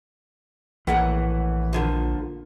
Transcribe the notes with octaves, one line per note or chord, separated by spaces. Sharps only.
A#1 A2 E3 A#3 F#5
A#2 D3 F3